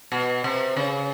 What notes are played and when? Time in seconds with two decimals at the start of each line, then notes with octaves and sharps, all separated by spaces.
0.12 B2
0.44 C3
0.77 C#3